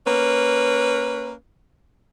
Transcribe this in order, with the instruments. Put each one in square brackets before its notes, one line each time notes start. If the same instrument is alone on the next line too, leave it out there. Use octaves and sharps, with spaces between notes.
[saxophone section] A#3 C#4 B4